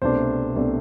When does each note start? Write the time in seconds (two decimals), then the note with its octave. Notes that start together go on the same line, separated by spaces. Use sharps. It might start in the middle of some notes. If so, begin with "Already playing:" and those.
0.02 C2 B2 A3 D4 C5
0.55 C2 B2 A3 D4